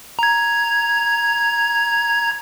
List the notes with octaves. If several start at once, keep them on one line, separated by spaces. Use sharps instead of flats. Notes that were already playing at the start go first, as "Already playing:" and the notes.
A#5 G#6